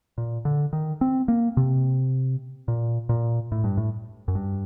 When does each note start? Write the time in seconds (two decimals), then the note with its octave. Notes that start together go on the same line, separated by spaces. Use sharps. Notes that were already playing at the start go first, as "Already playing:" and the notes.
0.18 A#2
0.45 D3
0.73 D#3
1.01 C4
1.28 A#3
1.57 C3
2.68 A#2
3.09 A#2
3.52 A2
3.64 G2
3.77 A2
4.28 F#2
4.35 G2